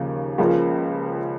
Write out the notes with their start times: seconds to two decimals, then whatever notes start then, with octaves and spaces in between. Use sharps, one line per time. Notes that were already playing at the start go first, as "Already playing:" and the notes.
Already playing: D#2 C#3 F3 A#3
0.38 C#2 C#3 F3 A#3 F4